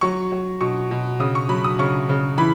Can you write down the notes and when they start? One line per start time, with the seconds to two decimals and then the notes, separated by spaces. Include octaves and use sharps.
0.01 F#3 C#6
0.32 F#3
0.61 B2 C#6
0.91 B2
1.20 C#3 D#6
1.35 C#6
1.49 F#3 B5
1.64 D#6
1.79 C#3 C#6
2.09 C#3
2.38 E3 B5